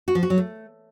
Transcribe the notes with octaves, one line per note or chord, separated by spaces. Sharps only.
F#4
F3
F#4
F#3
A3